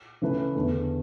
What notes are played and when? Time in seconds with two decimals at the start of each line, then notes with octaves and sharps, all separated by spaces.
0.22 C#3 E3 A3 E4 B4
0.55 E2 D3 A3